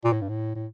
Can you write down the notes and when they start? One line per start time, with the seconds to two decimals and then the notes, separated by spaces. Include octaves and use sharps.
0.04 A#2
0.13 A2
0.21 G2
0.29 A2
0.55 A2